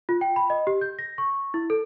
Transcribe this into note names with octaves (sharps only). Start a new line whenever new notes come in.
F4
G5
B5
D#5
G4
G6
A#6
C#6
E4
A4